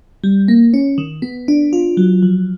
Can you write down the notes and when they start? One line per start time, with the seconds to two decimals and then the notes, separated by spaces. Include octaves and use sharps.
0.24 G3
0.48 A#3
0.74 C#4
0.98 D#3
1.22 B3
1.48 D4
1.73 F4
1.97 F#3
2.23 F3